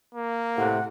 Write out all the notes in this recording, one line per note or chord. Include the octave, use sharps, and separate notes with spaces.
A#3
A2 C3 F#5